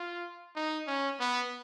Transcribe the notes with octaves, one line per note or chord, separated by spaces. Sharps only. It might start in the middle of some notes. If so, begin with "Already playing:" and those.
Already playing: F4
D#4
C#4
B3